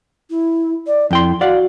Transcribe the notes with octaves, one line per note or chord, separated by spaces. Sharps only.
E4
D5
F2 E4 G5 C6
F#4 D5 F5 F#5